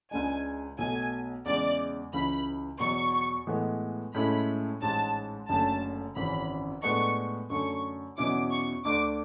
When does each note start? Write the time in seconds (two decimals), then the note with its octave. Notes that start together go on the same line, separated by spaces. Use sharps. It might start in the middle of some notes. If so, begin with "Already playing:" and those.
0.11 C#2 C#3 G#3 D4 G#5
0.78 B1 B2 A3 G#5
1.46 E2 C#3 G#3 D5
2.13 C#2 C#3 E3 B5
2.79 E2 B2 F#3 C#6
3.47 A2 E3 G#3 B3
4.14 A2 G#3 C#4 E4 B5
4.82 A1 G#2 G#3 A5
5.48 F#1 F#2 D3 A3 A5
6.16 G#1 F#2 C#3 E3 B5
6.83 A2 G#3 B3 D4 C#6
7.50 F#2 D3 A3 C#6
8.17 E2 B2 F#3 C#4 E4 D6
8.51 C#6
8.85 D2 D3 A3 D4 D6